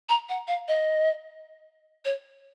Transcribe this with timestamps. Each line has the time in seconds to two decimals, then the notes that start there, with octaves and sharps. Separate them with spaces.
0.09 A#5
0.29 F#5
0.48 F5
0.68 D#5
2.05 C#5